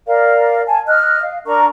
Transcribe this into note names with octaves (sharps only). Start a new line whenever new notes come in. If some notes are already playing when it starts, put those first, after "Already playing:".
A#4 D5 F5
G#5 A5
D#5 F6 F#6
F5
D4 A#4 A#5 C#6